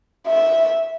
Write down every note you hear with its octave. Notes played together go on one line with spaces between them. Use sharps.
E5